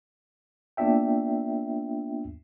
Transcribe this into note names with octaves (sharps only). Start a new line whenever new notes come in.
A#3 B3 D4 F4 E5 G5